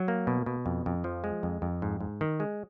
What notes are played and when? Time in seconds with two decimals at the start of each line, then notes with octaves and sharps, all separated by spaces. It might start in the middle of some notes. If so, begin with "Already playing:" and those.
Already playing: F#3
0.08 A#3
0.27 B2
0.46 B2
0.66 F2
0.86 F2
1.04 F3
1.24 G#3
1.43 F2
1.62 F2
1.82 G#2
2.01 G#2
2.21 D#3
2.40 G#3